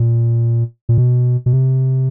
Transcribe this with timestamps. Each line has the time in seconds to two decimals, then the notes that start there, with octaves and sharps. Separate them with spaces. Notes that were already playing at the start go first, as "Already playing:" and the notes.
Already playing: A#2
0.89 A#2
0.98 B2
1.46 B2
1.53 C3